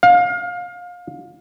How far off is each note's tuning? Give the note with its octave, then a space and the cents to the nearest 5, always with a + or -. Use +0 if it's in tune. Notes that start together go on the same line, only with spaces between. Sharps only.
F5 +25